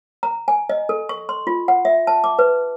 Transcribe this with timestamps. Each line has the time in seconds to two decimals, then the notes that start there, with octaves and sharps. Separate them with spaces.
0.23 A#5
0.48 G#5
0.69 D#5
0.89 A4
1.09 C#6
1.29 C6
1.47 F4
1.68 F#5
1.85 E5
2.07 A5
2.24 D6
2.39 B4